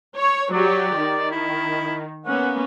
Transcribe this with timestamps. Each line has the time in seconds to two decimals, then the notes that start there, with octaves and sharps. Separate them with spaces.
0.16 C#5
0.52 F#3 G4 D5
0.97 D#3
1.31 E4
2.26 A#3 B3 C#4 F#5